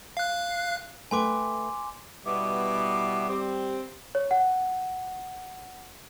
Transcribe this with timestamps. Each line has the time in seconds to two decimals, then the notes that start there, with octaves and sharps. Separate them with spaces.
0.17 F5 F#6
1.11 A3 B4 G5 G#5 C6 D6
2.25 B2 G3 B3 E4 D6
3.28 C4 G4
4.15 C#5
4.31 F#5